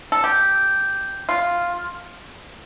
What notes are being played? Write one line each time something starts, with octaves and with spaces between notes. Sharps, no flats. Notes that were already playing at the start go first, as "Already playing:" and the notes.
A4
G4
F4